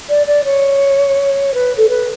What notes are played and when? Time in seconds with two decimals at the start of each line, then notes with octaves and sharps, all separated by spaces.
0.09 D5
0.26 D5
0.44 C#5
1.54 B4
1.77 A4
1.89 B4